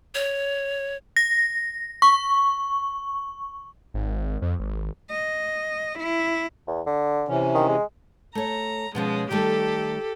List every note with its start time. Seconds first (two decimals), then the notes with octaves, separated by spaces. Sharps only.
0.15 C#5
1.16 A#6
2.02 C#6
3.94 G#1
4.42 F2
4.60 G#1
5.11 D#5
5.99 E4
6.68 E2
6.86 D3
7.28 C3 E3 C#4
7.55 D#3
7.68 G#3
8.35 A3 C#5 A#5
8.95 B2 F3 G#3 C#4
9.31 D#3 G3 A3 G4 A4